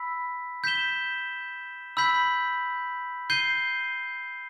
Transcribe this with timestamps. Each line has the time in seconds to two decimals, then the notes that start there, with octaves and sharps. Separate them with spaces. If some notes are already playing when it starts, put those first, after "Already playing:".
Already playing: B5 E6 B6
0.64 G6 B6 E7 G7
1.97 B5 E6 G6 B6 F#7
3.30 G6 C7 D#7 G7